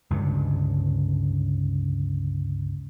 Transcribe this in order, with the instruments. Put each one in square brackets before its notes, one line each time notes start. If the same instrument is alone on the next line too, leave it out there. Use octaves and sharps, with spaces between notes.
[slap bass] C#2 G2 D3